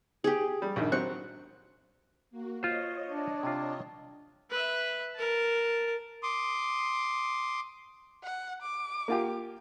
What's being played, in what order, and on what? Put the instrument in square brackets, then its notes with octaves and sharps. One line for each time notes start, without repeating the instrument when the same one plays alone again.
[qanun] G4 G#4
[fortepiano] G3
A#1 G2 D#3
[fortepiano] F#3 C4 F#6 [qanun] C#6
[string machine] A#3 F#4
[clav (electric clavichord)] F4 C5 [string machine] C#5 D#5
[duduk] D4
[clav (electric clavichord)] C3 F4
[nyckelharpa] B4 E5
A#4 A5
[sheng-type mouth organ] C6 D6 D#6
[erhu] F#5
D6
[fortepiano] A#3 F4 G4